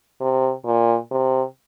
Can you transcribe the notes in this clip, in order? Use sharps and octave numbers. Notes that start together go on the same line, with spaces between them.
C3
A#2
C3